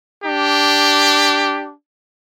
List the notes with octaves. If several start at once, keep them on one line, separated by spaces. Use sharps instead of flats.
D4 G4